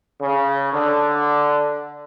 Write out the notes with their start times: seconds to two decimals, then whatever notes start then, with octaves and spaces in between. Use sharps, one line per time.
0.20 C#3
0.72 D3